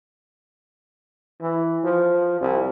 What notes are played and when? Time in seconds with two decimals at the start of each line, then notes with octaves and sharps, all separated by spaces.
1.41 E3
1.84 F3
2.41 C2